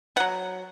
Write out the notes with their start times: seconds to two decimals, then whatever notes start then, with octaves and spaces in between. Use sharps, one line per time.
0.16 B3 F#5
0.20 F#3